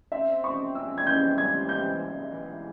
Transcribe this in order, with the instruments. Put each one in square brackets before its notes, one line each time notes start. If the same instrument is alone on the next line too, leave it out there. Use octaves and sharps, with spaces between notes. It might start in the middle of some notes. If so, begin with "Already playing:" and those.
[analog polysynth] C4 [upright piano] E5
[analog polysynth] C4 [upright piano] C#6
[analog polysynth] G#3 [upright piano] E6
[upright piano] G#6
[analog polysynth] E3 [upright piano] G6
[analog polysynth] G3 [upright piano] G#6
[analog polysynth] G3 [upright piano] G6
[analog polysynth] G#3
E3